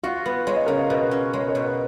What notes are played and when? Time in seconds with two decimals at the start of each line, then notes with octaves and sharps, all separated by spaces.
0.03 F4 F#4
0.26 B3
0.47 G#3 C#5
0.56 D#5
0.66 C#3 A#4 C#5
0.78 F5
0.89 B2 B4 D#5
1.11 C#4
1.33 G#3 C#5
1.40 B4
1.48 A#4 C#5
1.55 B2
1.66 B4